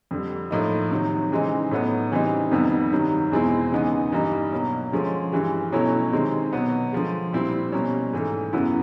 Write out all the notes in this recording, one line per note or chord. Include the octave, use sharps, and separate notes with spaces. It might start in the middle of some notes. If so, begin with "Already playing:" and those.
F2 D3 G3
A2 F3 A#3 D#4
C3 D#3 F#3
C#3 E3 G#3 C4 D#4
A2 F#3 B3 D#4
C#3 E3 G3 C4 D#4
F2 C3 D#3 G3 B3
G2 D#3 F#3
E2 B2 G#3 C4 E4
C#3 E3 G#3 B3 D#4
G2 E3 G3 A#3 D#4
B2 F#3 A#3
D3 F3 G#3 C#4
G2 E3 G#3
B2 F#3 A3 C#4 E4
C3 D#3 G#3 C4
B2 F#3 B3
D3 F3 G#3
A#2 G3 C4 E4
B2 G3 A#3 C#4
G#2 E3 A3
F#2 C#3 F#3 B3 E4